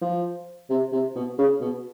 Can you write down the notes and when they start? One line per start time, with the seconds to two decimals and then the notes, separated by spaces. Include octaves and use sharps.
0.01 F3
0.70 C3
0.92 C3
1.15 B2
1.39 C#3
1.61 B2